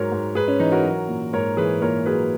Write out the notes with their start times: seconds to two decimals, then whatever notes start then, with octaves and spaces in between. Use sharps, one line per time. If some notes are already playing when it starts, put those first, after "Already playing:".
Already playing: G#2 F#3 A#4 C#5
0.12 G#2
0.35 G#2 G#4 B4
0.48 C#4
0.60 E3 D#4
0.72 F#4 A#4
0.84 F#3
1.08 A#2
1.33 G#2 A#4 C#5
1.57 E3 G#4 B4
1.82 A#2 A#4 C#5
2.06 F#3 G#4 B4